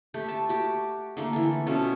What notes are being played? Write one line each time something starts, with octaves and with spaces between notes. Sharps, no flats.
A3 G4
A5
F#4 G4 D6
D3 A3 A#3
E3 A4
B2 F3 A3 C#4